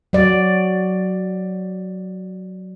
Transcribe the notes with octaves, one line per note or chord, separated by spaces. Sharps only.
F#3 D5